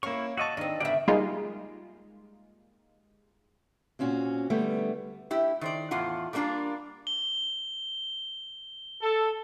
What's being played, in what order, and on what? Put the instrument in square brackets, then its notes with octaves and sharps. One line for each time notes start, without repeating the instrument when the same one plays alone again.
[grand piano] A#3 C#4 [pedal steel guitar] E4 C#6 [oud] F5
[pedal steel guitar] F#4 D#5 A5 [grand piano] C#6 D6 E6
[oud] D#3 C4 [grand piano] D4 [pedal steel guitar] D#5
[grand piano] G1 [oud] C#3 E5 [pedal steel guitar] D4 D5
[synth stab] G3 G#3 A#3 D#4 F4
[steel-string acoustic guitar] A#2 C4 C#4 F#4
D3 G3 A3 B3
[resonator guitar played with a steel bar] E4 G4
D#3 C5 D5
E2 A2 F4 F#5
G3 A3 A#3 D4 F4 A#4
[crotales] G7
[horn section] A4